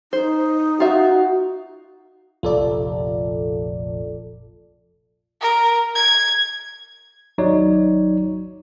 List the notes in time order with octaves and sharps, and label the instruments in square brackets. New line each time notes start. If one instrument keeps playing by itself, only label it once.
[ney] D#4 [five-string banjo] C5
[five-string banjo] F4 E5 [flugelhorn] F#4
[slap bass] F1 A#1 [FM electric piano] F4 A4 D5
[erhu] A#4
G#6
[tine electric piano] G#1 F#3 D#4 C#5 D5